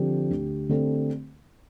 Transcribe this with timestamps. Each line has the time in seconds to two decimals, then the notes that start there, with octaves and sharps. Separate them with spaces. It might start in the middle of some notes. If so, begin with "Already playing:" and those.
Already playing: D3 F3 C4 G4
0.31 D2
0.69 D3 A3 C4